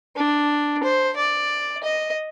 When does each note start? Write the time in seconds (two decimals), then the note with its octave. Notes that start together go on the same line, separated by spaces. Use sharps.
0.16 D4
0.83 C5
1.17 D5
1.84 D#5